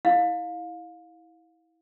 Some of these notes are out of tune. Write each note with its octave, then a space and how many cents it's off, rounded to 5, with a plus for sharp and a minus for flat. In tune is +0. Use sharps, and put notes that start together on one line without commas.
E4 -20 F5 +25